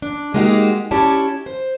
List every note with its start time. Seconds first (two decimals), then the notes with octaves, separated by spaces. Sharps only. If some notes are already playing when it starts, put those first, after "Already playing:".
0.02 D4
0.34 G#3 A#3 D#4 F#4 G4
0.91 C#4 E4 G4 C#5 D5 A5
1.46 C5